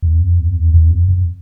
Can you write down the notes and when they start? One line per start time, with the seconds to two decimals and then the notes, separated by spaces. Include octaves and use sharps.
0.02 E2
0.20 F2
0.39 E2
0.47 F2
0.55 E2
0.74 E2
0.91 F2
1.09 F2